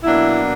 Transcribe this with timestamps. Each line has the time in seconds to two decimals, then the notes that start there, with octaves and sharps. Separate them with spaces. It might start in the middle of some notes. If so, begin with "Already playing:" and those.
0.03 B2 F#3 A#3 D4 E4